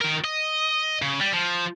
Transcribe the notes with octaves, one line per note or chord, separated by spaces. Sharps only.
D#3 A#4
D#5
C#3
G3
F3